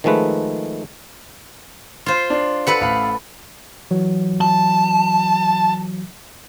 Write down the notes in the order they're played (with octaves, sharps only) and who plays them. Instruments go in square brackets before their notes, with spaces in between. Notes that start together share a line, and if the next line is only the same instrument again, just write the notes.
[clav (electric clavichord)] D#3 F3 G#3 A3 B4
[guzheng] F4 C5
[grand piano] D4
[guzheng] A4 B4 F#5
[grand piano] A1 F5 B5
[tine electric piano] E3 F#3
[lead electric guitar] A5